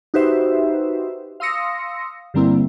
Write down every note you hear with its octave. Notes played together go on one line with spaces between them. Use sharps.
D#4 F#4 G4 B4 C5 E5
F5 C6 D#6 E6 A#6 C#7
G2 D3 G3 A#3 C4 E4